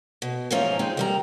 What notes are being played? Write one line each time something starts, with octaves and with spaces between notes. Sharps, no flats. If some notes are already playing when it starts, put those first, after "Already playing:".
B2
G#2 E3 F3 C#4 F4 A#5
G#3 C4 D#4 F4
D#3 G3 A#5